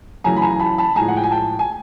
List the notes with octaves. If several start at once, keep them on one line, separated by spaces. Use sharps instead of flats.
F#2 C#3 E3 A3 G#5 A#5
B5
G#5 A#5
A5 B5
A5 B5
A2 F3 G#3 G#5 A#5
F#5
G5
G#5
G5 A5
G#5